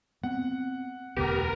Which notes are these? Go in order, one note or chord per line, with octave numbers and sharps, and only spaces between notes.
B3 C4 F#5
E1 D2 B3 G4 A#4